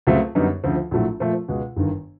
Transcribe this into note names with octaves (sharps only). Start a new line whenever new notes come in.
C#2 C#3 F#3 A3 C4
F#2 D3 G3 B3 D#4
D2 C#3 F3
A#1 A2 F#3 A3
A#2 F3 A3
C#2 B2 G#3
G1 G2 D#3